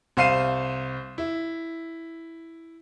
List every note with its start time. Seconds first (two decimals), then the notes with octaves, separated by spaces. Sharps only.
0.17 C2 C5 F5 C7 D#7 E7
1.18 E4